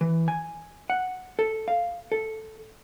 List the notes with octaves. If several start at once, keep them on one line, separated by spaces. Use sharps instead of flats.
E3
G#5
F#5
A4
F5
A4